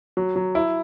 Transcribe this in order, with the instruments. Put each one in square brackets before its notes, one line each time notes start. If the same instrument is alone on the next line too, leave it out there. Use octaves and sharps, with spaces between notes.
[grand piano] F#3
F#3
E4